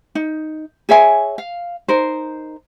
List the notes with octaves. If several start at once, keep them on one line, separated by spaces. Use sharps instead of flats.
D#4
G#4 C#5 E5 G#5
F5
D#4 A#4 C5